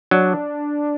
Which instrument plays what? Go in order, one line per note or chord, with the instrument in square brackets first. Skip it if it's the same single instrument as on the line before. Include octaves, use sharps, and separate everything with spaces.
[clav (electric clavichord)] F#3 [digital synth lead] D4